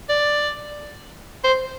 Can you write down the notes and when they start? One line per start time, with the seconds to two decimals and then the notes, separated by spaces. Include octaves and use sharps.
0.09 D5
1.44 C5